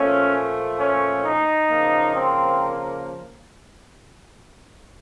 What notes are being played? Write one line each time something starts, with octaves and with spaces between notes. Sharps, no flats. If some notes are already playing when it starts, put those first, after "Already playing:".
Already playing: A#2 F3 A3 C#4
C#4
D#4
C#3 F3 A#3
C4